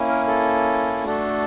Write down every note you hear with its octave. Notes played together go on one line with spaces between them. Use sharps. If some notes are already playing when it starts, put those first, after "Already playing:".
Already playing: A#3 C#4 E4
A#4
A4
A3 D4 F#4 A4